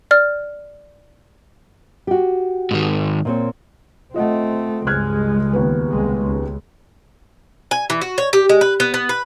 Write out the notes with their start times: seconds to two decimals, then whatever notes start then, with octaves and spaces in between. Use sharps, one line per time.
0.11 D5 F6
2.07 F#4 G4
2.71 G#2 D#3
3.25 A#2 C4 C#5
4.14 A3 C4 F4 D#5 F#5
4.87 C#2 G2 G#3 F6 F#6 G#6
5.53 D#2 B3 B4
5.90 C2 G#3
6.22 C#2
7.71 G#5
7.90 E3
8.01 F#4
8.18 C#5
8.33 G4
8.49 G#3
8.61 B4
8.80 B3
8.94 B3
9.09 B4